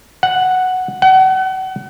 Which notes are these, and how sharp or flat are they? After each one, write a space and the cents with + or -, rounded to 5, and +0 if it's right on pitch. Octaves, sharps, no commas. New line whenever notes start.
F#5 +0
F#5 +35